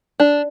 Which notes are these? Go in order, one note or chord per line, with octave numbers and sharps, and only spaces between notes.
D4